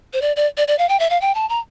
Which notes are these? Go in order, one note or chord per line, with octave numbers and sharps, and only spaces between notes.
C5
D5
D5
D5
D5
F5
G5
E5
F5
G5
A5
A#5